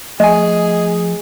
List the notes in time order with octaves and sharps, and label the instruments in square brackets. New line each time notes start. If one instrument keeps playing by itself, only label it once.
[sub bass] F3 [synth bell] A3 G#5 [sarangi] G#4 [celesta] D#5